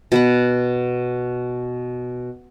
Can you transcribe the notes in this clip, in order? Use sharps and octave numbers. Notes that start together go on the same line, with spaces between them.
B2 B4 F#5